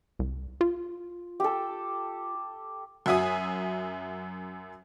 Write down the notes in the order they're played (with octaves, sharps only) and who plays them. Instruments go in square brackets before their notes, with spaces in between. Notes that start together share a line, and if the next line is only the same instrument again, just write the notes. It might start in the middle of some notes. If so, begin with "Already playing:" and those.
[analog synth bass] C2
F4
[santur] G4 A4
[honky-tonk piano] F#2 F#4 E5 G#5 D#6